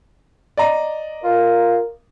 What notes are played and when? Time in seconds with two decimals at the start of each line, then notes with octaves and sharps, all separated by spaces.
0.57 D5 D#5 A#5
1.24 F4 A#4